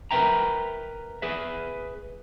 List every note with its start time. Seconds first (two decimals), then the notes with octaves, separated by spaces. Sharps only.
0.11 A#4 B4 D5 E5 G5 A#5
1.22 G#4 B4 E5